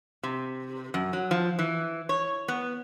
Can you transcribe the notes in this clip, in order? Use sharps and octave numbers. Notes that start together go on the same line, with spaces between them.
C3
F#2
F#3
F3
E3
C#5
B3